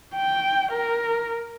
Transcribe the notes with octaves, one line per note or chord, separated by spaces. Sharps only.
G5
A#4